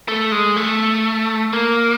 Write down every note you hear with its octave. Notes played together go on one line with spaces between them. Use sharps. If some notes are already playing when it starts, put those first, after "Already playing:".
A3
G#3
A3
A#3